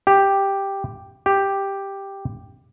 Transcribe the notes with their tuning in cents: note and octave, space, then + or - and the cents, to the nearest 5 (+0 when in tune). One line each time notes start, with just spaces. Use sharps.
G4 +5
G4 +5